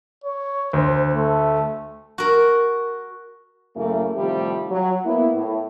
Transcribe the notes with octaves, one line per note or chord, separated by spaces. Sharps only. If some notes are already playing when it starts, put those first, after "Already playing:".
C#5
D2 C5
A3
F#4 A#4
F#2 A2 C#3 A3 A#3 E4
A2 C3 D#3 F3 G3 A3
F#3
A#3 B3 E4
A2